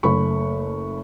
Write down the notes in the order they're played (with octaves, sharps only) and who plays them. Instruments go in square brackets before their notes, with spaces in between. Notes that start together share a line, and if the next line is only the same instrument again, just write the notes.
[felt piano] F#1 A3 B5 C#6